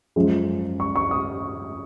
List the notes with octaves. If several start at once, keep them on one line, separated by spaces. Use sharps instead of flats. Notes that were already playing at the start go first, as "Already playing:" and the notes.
F#2 F3 G#3
C#6
C#6
D#6